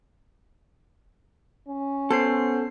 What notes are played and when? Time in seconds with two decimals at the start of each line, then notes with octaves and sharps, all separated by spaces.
1.68 C#4
2.10 B3 A4 C5 C7